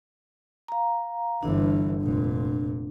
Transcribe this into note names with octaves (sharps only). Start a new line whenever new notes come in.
F5 A#5
G1 E3 D4
F1 A#2